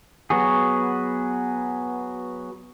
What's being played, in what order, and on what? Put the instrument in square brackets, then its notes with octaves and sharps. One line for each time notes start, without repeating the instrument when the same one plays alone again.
[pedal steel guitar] F#3 B3 F#4 G#4